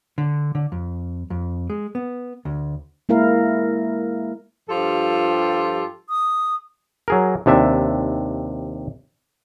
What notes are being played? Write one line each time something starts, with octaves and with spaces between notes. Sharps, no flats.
D3
D3
F2
F2
G#3
B3
D2
G#3 A#3 E4 A#4 F5
G2 F3 F4 G4 A4
D#6
F#3 G#4 A#4
D#2 C3 D4 E5